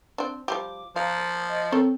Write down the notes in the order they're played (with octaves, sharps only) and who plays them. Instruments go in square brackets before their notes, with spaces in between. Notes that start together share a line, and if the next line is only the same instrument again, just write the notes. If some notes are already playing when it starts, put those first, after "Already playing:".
[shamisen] C4 D4
[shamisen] F3 G3 G4 [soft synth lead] D6
[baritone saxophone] F3 [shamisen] F5 [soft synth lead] A#5
[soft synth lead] D#5
[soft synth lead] C4 [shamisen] A4 A#4 C#5